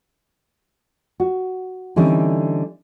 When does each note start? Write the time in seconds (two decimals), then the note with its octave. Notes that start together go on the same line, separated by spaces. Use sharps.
1.20 F#4
1.96 D3 E3 G3 C4 C#4 D#4